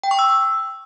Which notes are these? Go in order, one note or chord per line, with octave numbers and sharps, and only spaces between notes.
G5
C#6
E6